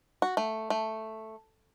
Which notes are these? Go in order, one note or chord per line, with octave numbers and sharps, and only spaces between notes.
F#4
A3
A3